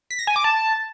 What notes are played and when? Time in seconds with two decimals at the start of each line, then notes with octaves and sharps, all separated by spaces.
0.10 B6
0.19 A#6
0.27 G#5
0.36 D6
0.44 A5